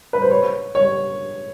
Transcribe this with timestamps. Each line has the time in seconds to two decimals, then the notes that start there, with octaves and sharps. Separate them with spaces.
0.13 B4
0.22 C5
0.31 C#5
0.75 C#5